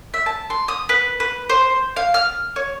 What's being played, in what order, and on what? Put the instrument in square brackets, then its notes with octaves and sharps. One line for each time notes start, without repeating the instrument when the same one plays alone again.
[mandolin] E5
A5
C6
D#6
B4
B4
C5
F5
F6
C#5